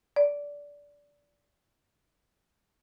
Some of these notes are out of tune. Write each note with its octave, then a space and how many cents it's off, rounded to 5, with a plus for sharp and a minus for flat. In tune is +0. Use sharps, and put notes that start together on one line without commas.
D5 -20